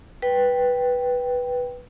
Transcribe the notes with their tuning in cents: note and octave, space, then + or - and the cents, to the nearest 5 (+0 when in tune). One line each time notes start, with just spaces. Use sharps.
B4 -5 G5 +0